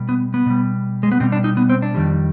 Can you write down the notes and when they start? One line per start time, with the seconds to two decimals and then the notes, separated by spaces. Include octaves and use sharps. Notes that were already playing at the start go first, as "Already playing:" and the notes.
Already playing: B2 G3
0.09 B3
0.34 B3
0.46 B2 G3
1.03 G#3
1.12 B3
1.20 B2 G3 C4
1.32 D4
1.44 D#4
1.57 B3
1.70 C4
1.82 D4
1.94 F2 D#3 G3